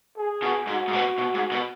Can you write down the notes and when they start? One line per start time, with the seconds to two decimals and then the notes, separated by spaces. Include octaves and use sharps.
0.17 G#4
0.42 B2
0.68 G#2 F#4
0.88 G#2
0.93 B2
1.18 B2
1.34 G#2
1.52 B2